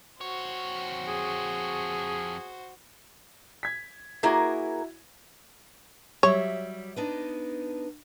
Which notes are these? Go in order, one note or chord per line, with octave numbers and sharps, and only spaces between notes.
F2 F#4 C5 C#5
G#4
G#6 B6
A#3 E4 F#4 G#4 A#4
F#3 G3 C#5 E5
B3 D4 D#4